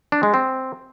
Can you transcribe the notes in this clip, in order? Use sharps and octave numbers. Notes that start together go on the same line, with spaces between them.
D4
G#3
C4